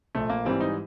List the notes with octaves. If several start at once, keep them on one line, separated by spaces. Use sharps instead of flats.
A#1 A3
A#3
G#2 E3 G3 C4
D#4